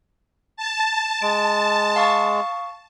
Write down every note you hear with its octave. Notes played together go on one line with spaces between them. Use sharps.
A5
G#3 D7
F5 C#6 D#6